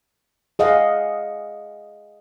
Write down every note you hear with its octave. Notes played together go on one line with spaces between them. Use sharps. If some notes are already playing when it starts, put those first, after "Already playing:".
G#4 D#5 F5 F#5